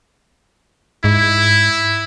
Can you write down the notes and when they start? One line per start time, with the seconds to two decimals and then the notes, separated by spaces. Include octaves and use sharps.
1.04 G#2 E4